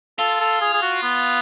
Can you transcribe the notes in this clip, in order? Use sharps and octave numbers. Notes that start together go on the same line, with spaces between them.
F4 A4
A4
G#4
G#4
F#4
B3